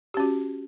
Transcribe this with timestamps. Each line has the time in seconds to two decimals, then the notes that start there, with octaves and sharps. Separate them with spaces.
0.14 G4
0.17 C#4
0.20 F#4